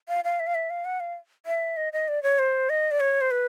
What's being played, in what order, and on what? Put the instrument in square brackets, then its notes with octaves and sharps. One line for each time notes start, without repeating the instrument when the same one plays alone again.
[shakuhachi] F5
F5
E5
F5
E5
F5
F#5
F5
E5
D#5
D#5
D5
C#5
C5
D#5
D5
C#5
C5
B4